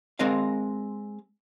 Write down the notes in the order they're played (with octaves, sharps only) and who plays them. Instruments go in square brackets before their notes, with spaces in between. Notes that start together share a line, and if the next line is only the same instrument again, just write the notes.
[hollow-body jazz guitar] G#3 C4 A#4 D#5 F5